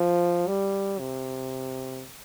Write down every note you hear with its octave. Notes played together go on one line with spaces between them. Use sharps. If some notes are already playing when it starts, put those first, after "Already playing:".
Already playing: F3
G3
C3